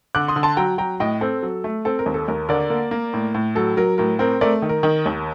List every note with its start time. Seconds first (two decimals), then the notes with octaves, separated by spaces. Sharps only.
0.15 D3 D6 F#6
0.28 C6 D#6
0.36 D3
0.43 A5 C6
0.57 F#3 G5 A#5
0.78 F#3 G5 A#5
1.00 A2 D#5 G5
1.21 C4 A4
1.43 F#3
1.64 A3
1.85 C4 A4
1.99 A#4
2.06 D#2
2.14 A4
2.28 D#2 A#4
2.49 D3 A#4 D5
2.70 A#3
2.91 A#3
3.13 A2
3.34 A2
3.55 F#3 A4
3.77 F#3 A#4
3.98 A2 A#4
4.19 C4 A#4
4.41 A3 A#4 D5
4.62 D#3
4.69 A#4
4.83 D#3
5.06 D#2